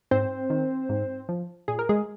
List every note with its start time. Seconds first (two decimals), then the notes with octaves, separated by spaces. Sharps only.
0.11 G#2 C4 C5
0.50 D#3
0.89 G#2
1.29 F3
1.68 A#2 G#4
1.79 A#4
1.89 G#3 G#4